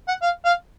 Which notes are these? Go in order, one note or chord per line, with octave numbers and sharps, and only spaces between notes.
F#5
F5
F5